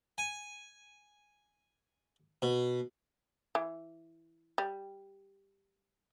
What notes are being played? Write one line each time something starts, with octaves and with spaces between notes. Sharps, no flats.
G#5
B2
E3
G3